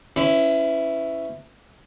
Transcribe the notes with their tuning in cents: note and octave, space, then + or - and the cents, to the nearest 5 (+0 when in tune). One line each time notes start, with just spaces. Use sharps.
C#4 +0 E4 +0 B4 +40